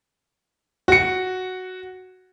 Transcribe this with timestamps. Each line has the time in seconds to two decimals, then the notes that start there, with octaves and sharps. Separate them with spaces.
0.88 F#4 C#7